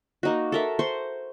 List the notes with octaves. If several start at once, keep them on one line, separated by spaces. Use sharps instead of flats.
A#3 D#4 F#4
A4 A#4 E5
C5 C6 C#6